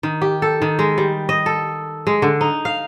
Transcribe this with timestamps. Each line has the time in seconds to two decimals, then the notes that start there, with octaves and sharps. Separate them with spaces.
0.03 D#3
0.22 G4
0.42 A4
0.62 D#3
0.79 G#3
0.98 G3
1.29 D#5
1.46 A4
2.07 G#3
2.22 D3
2.41 D#4
2.65 F5